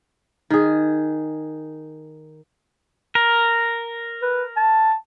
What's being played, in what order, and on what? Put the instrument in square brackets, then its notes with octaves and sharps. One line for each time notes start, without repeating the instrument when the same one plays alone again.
[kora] D#3 G#4
[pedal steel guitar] A#4
[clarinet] B4
A5